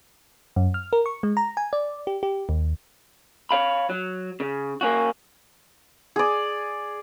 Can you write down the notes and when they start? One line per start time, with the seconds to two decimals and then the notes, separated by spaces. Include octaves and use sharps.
0.56 F#2
0.74 F6
0.93 A#4
1.06 C#6
1.23 G#3
1.37 A#5
1.57 G#5
1.73 D5
2.07 G4
2.23 G4
2.49 D#2
3.51 C#5 F5 B5
3.90 F#3
4.40 C#3
4.81 A#3 C#4 F#4
6.16 G#4 D5